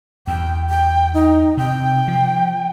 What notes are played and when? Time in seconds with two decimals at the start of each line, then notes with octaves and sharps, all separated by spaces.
0.27 E2 G5
0.70 G5
1.14 D#4
1.57 C3 G5
2.08 F3